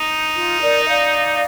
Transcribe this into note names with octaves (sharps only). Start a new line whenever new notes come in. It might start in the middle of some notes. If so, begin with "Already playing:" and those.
Already playing: D#4
F4
A#4 D5
D#5
D5 F5